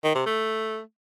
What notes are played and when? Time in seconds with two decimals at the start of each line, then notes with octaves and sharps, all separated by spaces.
0.04 D#3
0.15 C3
0.26 A3